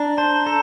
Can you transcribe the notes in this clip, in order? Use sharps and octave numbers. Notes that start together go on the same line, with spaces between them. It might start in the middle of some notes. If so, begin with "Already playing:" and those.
Already playing: D4 A#5
C5 A5
A4 A#5